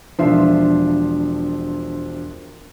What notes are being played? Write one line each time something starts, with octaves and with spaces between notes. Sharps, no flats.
E1 F3 D4 F4 E5 C6